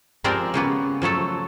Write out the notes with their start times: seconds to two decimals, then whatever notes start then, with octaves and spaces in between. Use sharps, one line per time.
0.24 F3 G#3 C4 G4 A#4 D5
0.54 C#3 A#3 B3
1.02 F3 F#3 A3 A4